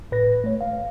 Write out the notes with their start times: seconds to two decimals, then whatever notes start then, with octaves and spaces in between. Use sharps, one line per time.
0.12 A2 B4 A#6
0.44 A3 C#5
0.61 F5